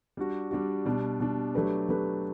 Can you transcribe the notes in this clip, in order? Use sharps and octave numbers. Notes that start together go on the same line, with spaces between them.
G3 D4 F#4
G3 D4 F#4
B2 G3 D4
B2 G3 D4
F#3 A3 D4 G4 B4
F#3 A3 D4 G4 B4